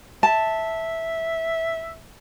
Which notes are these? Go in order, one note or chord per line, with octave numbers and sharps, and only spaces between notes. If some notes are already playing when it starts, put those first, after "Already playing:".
E5 A5